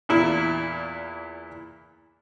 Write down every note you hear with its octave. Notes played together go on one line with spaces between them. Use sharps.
E2 A#2 E4